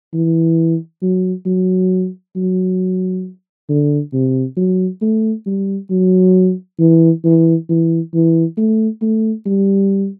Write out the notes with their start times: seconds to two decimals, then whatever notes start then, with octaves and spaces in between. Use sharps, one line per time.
0.14 E3
1.02 F#3
1.46 F#3
2.36 F#3
3.69 D3
4.13 C3
4.57 F#3
5.02 A3
5.46 G3
5.90 F#3
6.80 E3
7.24 E3
7.69 E3
8.14 E3
8.58 A3
9.02 A3
9.46 G3